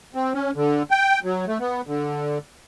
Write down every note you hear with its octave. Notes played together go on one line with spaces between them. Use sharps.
C4
C#4
D3
G5
F#3
A3
B3
D3